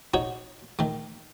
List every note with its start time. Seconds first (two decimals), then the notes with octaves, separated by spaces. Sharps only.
0.14 D#4 F#4 C#5
0.79 D#3 A3